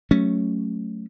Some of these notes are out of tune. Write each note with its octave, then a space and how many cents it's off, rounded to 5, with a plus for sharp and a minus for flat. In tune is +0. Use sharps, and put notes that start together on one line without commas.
F#3 +0 A3 +0 C#4 +0